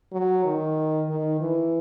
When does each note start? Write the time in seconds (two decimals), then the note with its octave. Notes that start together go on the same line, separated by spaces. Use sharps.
0.12 F#3
0.45 D#3
1.09 D#3
1.41 E3